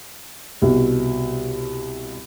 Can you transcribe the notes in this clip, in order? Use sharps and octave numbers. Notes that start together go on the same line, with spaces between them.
C2 B2